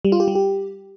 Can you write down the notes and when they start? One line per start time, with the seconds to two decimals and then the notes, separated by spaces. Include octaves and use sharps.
0.05 G3
0.12 F4
0.20 G4
0.28 G3
0.35 G4